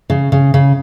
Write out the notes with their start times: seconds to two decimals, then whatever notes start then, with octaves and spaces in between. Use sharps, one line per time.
0.10 C#3
0.32 C#3
0.54 C#3